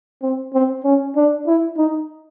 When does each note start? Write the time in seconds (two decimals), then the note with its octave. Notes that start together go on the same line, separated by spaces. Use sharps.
0.23 C4
0.54 C4
0.84 C#4
1.16 D4
1.47 E4
1.78 D#4